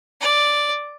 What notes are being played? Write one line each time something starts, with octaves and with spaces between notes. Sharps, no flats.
D5